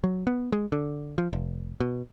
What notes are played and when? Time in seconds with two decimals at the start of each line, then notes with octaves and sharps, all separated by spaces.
0.04 F#3
0.27 B3
0.52 G#3
0.72 D3
1.18 F3
1.33 F1
1.80 B2